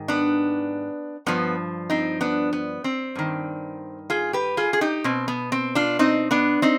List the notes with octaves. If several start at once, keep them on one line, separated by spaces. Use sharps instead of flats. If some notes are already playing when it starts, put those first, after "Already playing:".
Already playing: G#2 D#3
B3 D4
G2 F3 B3
C4 D#4
B3 D4
B3
C4
G2 D#3
F4 G#4
G4 B4
F4 G#4
G#4
D#4 G4
B2 C4
B3
C4
D4 F4
C4 D#4
B3 D4
C4 D#4